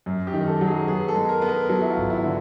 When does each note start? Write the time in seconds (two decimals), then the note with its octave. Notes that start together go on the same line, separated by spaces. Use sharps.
0.06 F#2
0.27 G4
0.34 D#3
0.47 A4
0.61 F#3
0.68 G#4
0.88 B3 G#4
1.08 A4
1.15 G#3
1.29 A#4
1.42 B3
1.49 A#4
1.69 F#3 A4
1.82 E4
1.90 F4
1.97 G#1
2.10 E4
2.24 D3